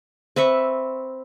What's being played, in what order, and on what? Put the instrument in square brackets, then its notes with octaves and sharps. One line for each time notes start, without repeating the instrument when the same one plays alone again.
[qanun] C4 B4 E5 C#6